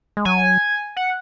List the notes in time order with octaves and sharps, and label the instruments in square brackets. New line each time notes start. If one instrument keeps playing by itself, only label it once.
[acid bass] G#3
[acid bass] F#3 [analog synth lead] G#5
[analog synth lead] F#5